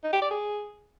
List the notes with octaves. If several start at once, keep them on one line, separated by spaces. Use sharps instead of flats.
D#4
G4
D5
G#4